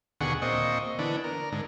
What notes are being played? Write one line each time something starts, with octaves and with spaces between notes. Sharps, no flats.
D#2 B2 D3 G#4 F#5 C#6
A#2 C4 D#5 C#6
D3 E3 B3 D4
A#4
G#2 D3